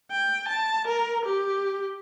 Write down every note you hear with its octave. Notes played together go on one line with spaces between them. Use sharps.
G5
A5
A#4
G4